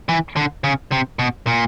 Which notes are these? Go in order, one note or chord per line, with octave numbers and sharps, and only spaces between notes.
E3
D3
C#3
C3
B2
A#2